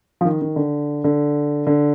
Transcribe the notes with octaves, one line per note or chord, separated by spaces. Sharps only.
F3
D#3
D#3
D3
D3
D3